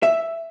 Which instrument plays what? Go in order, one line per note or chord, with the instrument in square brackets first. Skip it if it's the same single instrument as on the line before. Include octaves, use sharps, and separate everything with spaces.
[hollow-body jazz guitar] E5